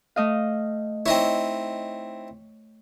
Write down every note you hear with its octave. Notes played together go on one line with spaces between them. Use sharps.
A3 D#5 F5
C4 D#4 E4 C#5